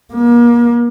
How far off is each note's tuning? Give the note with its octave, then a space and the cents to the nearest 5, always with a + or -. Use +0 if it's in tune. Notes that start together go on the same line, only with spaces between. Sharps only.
A#3 +35